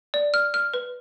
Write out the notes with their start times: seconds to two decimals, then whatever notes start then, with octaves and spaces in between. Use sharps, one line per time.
0.14 D5
0.34 F6
0.54 F6
0.74 B4